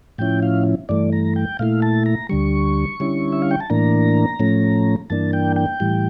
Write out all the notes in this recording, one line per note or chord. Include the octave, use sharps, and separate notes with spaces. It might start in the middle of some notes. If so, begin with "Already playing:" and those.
A2 F3 C#4 E4 G5
F5
G2 E3 A3 D5
A#5
G5
A#2 A3 E4 F5
A5
A#5
D2 D3 G3 C#6
D3 G3 C#4 E4
E5
F5
G5
A5
A2 E3 A#3 D4 A#5
A2 F3 A3 C#4
G2 E3 A#3 D4 A5
G5
G5
A2 E3 G3